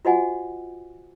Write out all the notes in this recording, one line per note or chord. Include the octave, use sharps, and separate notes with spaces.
F4 F#4 C5 D#5 F#5 G#5